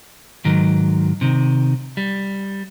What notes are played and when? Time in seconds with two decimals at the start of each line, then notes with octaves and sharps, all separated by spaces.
0.45 G#2 D#3 F#3
1.21 C3 D#3
1.97 G3